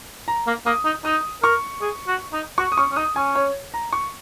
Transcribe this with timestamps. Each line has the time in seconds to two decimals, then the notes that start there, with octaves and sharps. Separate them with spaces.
0.28 A#5
0.47 A#3
0.66 A#3 D#6
0.85 D#4
1.05 D#4 D#6
1.43 A#4 C#6
1.81 G#4
2.08 F#4
2.33 D#4
2.58 F#4 C#6
2.72 D#6
2.77 C#4 C#6
2.92 C#4
2.96 D#4 D#6
3.16 C#4 G#5
3.35 C#5
3.74 A#5
3.93 C#6